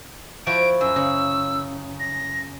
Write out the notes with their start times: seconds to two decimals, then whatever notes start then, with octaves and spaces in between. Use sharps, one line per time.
0.47 F3 E4 F#4 D7
0.81 F#2 E6
0.96 C#3
2.00 A#6